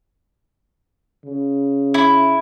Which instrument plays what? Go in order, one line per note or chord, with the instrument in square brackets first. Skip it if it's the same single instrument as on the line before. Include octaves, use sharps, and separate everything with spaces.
[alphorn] C#3
[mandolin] E4